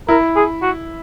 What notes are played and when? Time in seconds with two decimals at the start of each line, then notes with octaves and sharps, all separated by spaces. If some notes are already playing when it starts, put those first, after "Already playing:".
0.08 E4 A#4
0.36 G#4
0.62 F#4